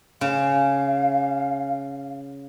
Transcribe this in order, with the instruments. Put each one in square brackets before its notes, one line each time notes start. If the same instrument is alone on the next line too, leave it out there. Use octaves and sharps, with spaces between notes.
[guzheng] C#3 [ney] F5